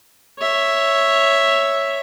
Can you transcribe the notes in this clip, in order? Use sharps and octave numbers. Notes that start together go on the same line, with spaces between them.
C#5 E5